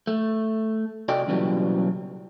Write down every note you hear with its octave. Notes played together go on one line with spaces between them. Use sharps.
A3
C3 F#4 A4 D5 D#5 G5
B1 A#2 C#3 E3 F#3 G3